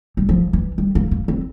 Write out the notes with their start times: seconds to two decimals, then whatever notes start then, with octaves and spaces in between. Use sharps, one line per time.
0.17 G3
0.29 F3
0.53 E3
0.78 G3
0.95 A#3
1.11 A#3
1.28 C4